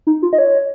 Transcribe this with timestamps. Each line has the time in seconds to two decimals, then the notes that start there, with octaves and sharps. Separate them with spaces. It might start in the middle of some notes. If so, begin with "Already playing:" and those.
0.07 D#4
0.22 F4
0.33 D#5
0.38 C#5